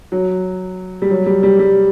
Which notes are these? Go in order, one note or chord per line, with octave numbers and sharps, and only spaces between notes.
F#3
G3
F#3
G3
G3
G3